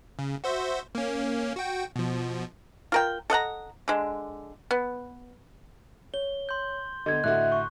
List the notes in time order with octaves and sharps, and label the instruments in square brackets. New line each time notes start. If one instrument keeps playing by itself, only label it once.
[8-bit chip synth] C#3
F#4 C5 E5
A#3 C#4
F#4 G5
B2 F3
[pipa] F4 A#4 G5
A4 D#5 F#5 A#5
D3 G#3
B3
[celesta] C#5 [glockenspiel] G7
[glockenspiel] C6 G6
[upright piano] D3 B3 [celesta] D#5 G#6
[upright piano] A2 D3 F#4 [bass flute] E5 [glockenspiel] F#6
[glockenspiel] C#6